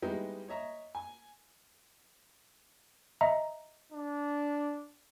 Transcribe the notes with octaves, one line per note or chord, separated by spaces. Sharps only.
G3 G#3 B3 D#4 E4 G4
C#5 D#5 E5 A#5
G#5
D#5 E5 A#5
D4